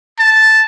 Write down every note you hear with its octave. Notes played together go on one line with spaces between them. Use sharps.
A5